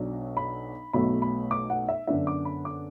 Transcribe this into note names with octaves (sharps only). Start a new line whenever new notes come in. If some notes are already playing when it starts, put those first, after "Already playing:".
Already playing: B1 B2 F#3 D4
B5
B1 B2 F#3 A3 B5
B5
D6
F#5
E5
F#2 D3 B3 D4 E5
D6
B5
D6